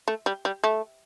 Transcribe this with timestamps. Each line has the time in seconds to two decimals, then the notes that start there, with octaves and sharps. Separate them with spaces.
0.08 A3
0.26 G3
0.45 G3
0.64 A3